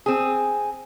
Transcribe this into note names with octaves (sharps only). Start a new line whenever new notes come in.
C4 G#4